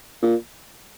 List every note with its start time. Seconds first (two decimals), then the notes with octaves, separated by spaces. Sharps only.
0.22 A#2